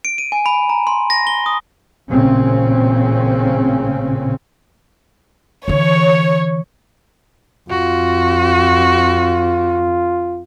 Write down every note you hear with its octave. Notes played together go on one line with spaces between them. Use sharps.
D7
D#7
G#5
B5
A#5
C6
A#6
G7
D#6
A1 A#2 C#3 C4 C#4
D3 E3 C#5
F2 F4 F#4